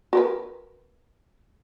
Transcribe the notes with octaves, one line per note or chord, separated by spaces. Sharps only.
F#4 A#4 B4